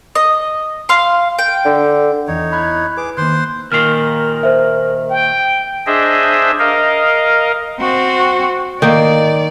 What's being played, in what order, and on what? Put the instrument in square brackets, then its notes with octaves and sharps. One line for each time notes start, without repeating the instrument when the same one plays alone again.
[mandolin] D#5
F5 C6
G5
[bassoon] D3
[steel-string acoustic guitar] E2 E4 [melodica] D#4 C#5
[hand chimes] B5 F#6 G#6
[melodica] G#4 D6 [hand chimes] B4
[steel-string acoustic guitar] D#3 [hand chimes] A#3 F#6 [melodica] C5 C6
[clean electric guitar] D#2 A#2 D#3 [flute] A#4 [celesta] F6 C7
[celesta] C5 E5
[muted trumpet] G5
[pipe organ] D4 G#4 C5 D#5 E5
A#4 D#5 F5
[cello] C4 F#4
[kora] D#3 A#3 [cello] D5